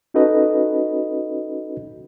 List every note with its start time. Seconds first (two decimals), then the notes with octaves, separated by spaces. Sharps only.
0.14 C#4 D#4 F#4 A4 B4 D#5